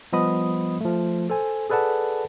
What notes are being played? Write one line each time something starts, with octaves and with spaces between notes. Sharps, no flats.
F3 G3 B3 D#5 B5 D#6
F3 A3
A4 C5 G#5
G#4 A4 B4 D5 F#5 A5